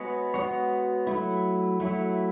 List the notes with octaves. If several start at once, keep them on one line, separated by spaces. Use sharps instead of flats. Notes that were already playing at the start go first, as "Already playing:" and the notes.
Already playing: G#3 B3 F#4 C#5
G#3 B3 F#4 C#5
F#3 A3 E4
F#3 A3 E4